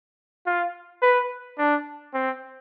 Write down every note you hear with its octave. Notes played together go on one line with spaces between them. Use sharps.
F4
B4
D4
C4